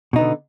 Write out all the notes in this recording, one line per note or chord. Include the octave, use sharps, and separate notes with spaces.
B2 D3 B3 D#4